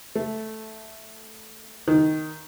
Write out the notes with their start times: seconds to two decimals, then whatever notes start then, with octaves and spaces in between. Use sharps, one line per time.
0.15 A3
1.88 D#3